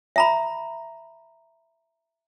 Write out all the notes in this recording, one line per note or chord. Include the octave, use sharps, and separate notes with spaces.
E5 A#5 B5